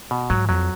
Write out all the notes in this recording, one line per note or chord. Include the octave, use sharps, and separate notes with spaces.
B2
G#2 F#3
F2 F#3